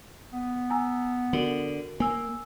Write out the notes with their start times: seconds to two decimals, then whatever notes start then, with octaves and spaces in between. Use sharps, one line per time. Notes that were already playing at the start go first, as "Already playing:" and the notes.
0.32 B3
0.70 G#5 A#5 E6
1.33 D3 F#4 A#4 F#7
2.00 A#3 G#5 E6